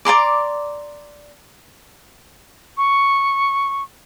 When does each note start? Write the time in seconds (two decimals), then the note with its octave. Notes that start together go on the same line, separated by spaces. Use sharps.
0.05 D5 A#5 C6 D6
2.77 C#6